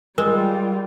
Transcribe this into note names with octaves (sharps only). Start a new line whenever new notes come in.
G3 G#3 F4 A#4